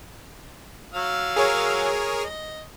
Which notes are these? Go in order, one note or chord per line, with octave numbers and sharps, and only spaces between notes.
F#3 F5 E6
G#4 A#4 C#5
D#5